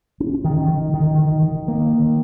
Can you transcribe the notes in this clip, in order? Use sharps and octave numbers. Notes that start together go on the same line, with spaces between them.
C#4
D#3
D#3
D#3
D#3
D#3
A#3
D#3